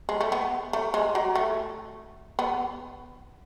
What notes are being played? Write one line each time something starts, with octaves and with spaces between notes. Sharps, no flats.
G#3
A3
B3
A3
G#3
F#3
A3
B3